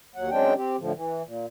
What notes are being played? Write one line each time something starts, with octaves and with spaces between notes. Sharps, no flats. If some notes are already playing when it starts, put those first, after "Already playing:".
D#2 F#3 F#5
C#3 F#3 G#3 C4 D4 G5
C4 G4
A2 D3 F3
E3
A#2